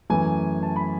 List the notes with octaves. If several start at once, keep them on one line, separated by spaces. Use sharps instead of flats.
F#2 E3 A3 G#5
A5
B5